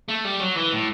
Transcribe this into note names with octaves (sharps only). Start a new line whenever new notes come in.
A3
G3
F#3
E3
A2